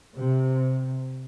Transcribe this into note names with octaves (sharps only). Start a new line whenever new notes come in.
C3